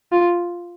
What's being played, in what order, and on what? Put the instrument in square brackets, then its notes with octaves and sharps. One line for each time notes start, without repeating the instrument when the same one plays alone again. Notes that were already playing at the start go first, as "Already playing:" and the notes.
[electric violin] F4